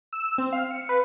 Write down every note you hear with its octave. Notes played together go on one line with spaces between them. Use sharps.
E6
C4
F5
C#7
B4